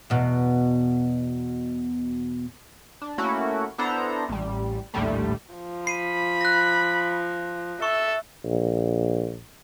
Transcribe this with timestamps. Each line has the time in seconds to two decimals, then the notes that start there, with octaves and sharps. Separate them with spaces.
0.10 E2 B2
3.02 D4
3.18 A3 A#3 C#4 E4 F#4
3.78 B3 D4 E4 A4 C5 A#5
4.29 A1 G3
4.94 A#1 D#2 A2 D3 G3 A3
5.54 F3
5.87 B5 C7 D#7
6.41 F#6 A#6
7.82 A4 E5 C#6
8.45 A#1